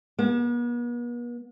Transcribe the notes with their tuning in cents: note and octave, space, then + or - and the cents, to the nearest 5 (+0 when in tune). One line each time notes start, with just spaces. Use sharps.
B3 -45